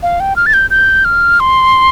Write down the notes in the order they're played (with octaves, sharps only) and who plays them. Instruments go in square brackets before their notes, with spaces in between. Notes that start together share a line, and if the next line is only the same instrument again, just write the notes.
[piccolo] F5
G5
F6
A6
G6
G6
F6
C6